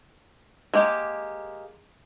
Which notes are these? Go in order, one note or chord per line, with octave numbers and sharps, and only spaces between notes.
G#3 A#3 G4